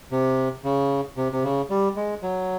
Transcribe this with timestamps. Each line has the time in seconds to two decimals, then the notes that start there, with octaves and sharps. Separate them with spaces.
0.12 C3
0.64 C#3
1.17 C3
1.32 C3
1.43 C#3
1.70 G3
1.96 G#3
2.22 F#3